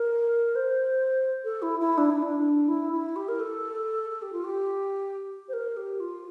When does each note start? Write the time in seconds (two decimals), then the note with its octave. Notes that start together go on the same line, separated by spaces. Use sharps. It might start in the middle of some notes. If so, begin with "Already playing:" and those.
Already playing: A#4
0.55 C5
1.44 A4
1.62 E4
1.79 E4
1.97 D4
2.10 E4
2.22 D4
2.68 E4
2.92 E4
3.16 G4
3.28 A#4
3.39 A4
4.10 A4
4.22 G4
4.32 F4
4.44 G4
5.48 C5
5.53 A#4
5.76 G4
6.00 F4